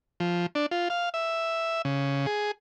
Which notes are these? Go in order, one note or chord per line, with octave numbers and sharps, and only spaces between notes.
F3
D4
F4
F5
E5
C#3
G#4